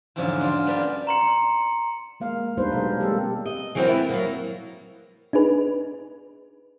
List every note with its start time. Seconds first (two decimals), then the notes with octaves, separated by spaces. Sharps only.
0.16 E2 G#2 D3 F3 F#3 C#4
0.39 C#4 D4 F4 F#4
0.66 G3 B3 D4 A#4
1.07 A#5 C6 C#7
2.20 G#3 A#3 F5
2.57 G3 B3 D4 D#4 B4 C5
2.72 B2 F#3 G#3 G#4 A#4 F5
3.00 G3 G#3 A#3 C4 G4 A4
3.46 D#5
3.75 E3 F#3 A#3 C4 F4 F#4
3.87 B3 E4
4.09 F#3 A#3
5.33 D4 D#4 G#4 B4